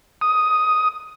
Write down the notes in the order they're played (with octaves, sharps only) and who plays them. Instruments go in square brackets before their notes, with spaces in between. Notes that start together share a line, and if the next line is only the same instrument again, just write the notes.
[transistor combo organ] D#6